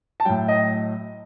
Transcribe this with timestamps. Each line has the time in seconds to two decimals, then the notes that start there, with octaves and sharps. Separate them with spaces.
0.20 A5
0.25 A2 F#3 G5
0.48 D#5